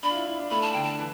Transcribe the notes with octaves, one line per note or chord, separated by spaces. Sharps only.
D4 B5
F4
E4
E4
D4
A3 B5
A5
D3 G5
A5
E3